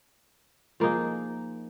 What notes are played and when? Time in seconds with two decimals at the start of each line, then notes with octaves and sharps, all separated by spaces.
0.80 F3 A#3 D#4 G#4